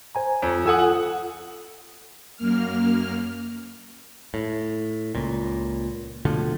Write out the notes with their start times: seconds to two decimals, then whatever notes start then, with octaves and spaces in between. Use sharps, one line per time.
0.15 C5 G#5 A#5
0.42 F2
0.66 F4 A4 F#5 G#5 D#6 E6
0.79 F#5
2.37 F#2 A#3 F6
4.34 A2
5.15 C#2 A#2
6.25 B2 D3 F3 A3